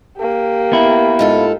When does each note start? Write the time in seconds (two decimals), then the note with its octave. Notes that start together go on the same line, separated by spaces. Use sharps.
0.18 A#3 G4
0.72 B3 E4
1.19 G#2 F4 A4